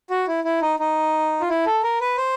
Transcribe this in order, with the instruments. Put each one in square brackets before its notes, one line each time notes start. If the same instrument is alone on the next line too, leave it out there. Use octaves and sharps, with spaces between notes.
[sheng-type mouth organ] F#4
E4
E4
D#4
D#4
F4
E4
A4
A#4
B4
C5